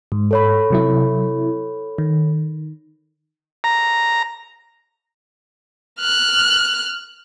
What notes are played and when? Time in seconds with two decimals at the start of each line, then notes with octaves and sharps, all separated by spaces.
0.12 G#2
0.31 A4 C#5 B5
0.70 C3 F#3 E4
1.98 D#3
3.64 A#5
5.99 F6 F#6